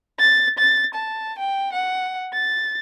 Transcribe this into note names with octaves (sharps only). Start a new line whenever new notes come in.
A6
A6
A5
G5
F#5
A6